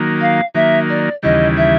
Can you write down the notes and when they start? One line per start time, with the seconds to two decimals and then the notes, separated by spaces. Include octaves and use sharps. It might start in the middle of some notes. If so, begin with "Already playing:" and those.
Already playing: D#3 F#3 A#3
0.21 F5
0.55 D#3 F#3 A#3 E5
0.89 D5
1.23 D#2 C#3 E3 G3 D#5
1.57 E5